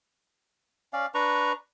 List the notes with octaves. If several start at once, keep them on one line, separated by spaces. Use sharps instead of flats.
C#4 D5 F5
D4 B4 A#5 C#6